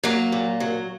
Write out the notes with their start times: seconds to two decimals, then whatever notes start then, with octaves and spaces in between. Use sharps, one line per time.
0.04 F#3 A#3
0.32 A#2
0.60 F#3